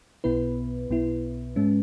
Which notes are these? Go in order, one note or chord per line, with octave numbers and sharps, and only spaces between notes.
B1 B2 B3 E4 B4
B1 B2 B3 E4
G#2 G#3 C#4